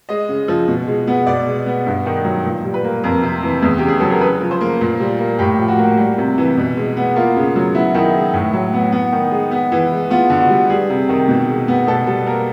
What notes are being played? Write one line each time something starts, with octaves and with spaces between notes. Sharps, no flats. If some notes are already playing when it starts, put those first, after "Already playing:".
G#3 D#5
C#3
F3
B2
G#3
B3
B2 D5
G#3
B3
G2
D#3
F#3
A#2
G3
B4
A#3
F2 A#4
C3
E3
E2
C#3 G4
G#4
F#3 A4
A#4
C#3 B4
F3
C5
A#3
A#2
G3
A#3
A2 G4
F3
F#4
A#3
G3
C3
E3
B2
G#3
B3
A#3 F4
C#3
F#3
B3 E4
D#3 E4
G#3
A2
F#3
B3
B3
D#3
G#3
B3
E3
G#3
B3 F4
D3
F#4
G3
G3 G#4
C3
D#3
B2
G#3
B3
B2 A4
G3 A4
A#3 A#4